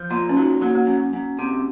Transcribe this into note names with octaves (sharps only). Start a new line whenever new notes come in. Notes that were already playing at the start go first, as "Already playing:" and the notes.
Already playing: F3
A#2 F4
C#4
F#3 D#4
F#3 A#3
A#3
F#2
F#2
C3